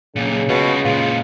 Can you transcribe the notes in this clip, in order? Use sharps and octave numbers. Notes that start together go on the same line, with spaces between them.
B1 A#2 C#3
B2 G#3 F4
A#2 G#3 F4